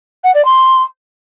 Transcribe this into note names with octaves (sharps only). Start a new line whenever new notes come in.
F#5
D5
C6